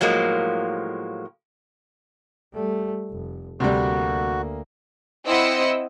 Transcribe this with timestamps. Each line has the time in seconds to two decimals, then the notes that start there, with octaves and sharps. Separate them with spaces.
0.01 A2 F3 F#3 G#3 A#3
2.54 G3 A3
3.10 F1
3.60 D2 C3 G3 A#3 F#4
5.26 C4 E4 D#5 F#5 E6 C#7